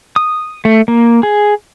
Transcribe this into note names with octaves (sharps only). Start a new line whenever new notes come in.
D#6
A3
A#3
G#4